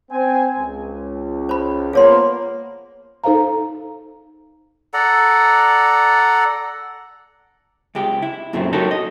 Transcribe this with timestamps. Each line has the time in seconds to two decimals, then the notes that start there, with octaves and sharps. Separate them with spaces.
0.11 C4 G#5
0.58 C#2
1.49 C5 B5
1.93 F3 A#3 B3 G#4 C#5 C6
3.24 D#4 A4 C5 F5 A#5
4.94 A4 D5 F#5 A#5
7.95 C#2 G#3 G4
8.22 E4
8.53 F#2 A#2 C#3 F#3 A3 C4
8.73 D#4 F#4 G4 A4 A#4 C#5
8.91 D#5